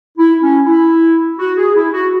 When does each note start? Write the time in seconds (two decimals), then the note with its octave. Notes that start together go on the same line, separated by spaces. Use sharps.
0.18 E4
0.43 C#4
0.66 E4
1.39 F#4
1.58 G#4
1.76 E4
1.93 F#4